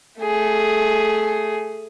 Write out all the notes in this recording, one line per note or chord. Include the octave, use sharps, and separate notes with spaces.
A3 G#4